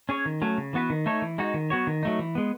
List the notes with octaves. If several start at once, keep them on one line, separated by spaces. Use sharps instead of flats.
C#4 G#4 C#5
D#3
F#3 A3 C#4
C#3
E3 B3 F#4 B4
D#3
A3 D#4 A4 C#5
E3
G#3 D#4 F#4
D#3
F#3 B3 F#4 C#5
D#3
F#3 A3 D#4
E3
G#3 B3